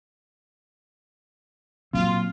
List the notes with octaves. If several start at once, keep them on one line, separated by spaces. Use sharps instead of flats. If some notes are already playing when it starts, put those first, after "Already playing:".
A#2 F#3 C4 F4